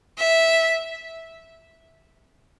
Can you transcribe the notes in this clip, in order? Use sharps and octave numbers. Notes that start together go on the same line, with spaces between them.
E5